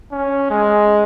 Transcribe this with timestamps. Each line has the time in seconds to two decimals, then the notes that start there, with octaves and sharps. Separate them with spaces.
0.11 C#4
0.50 G#3